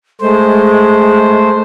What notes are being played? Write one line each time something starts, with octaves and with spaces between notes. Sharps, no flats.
G#3 A3 C5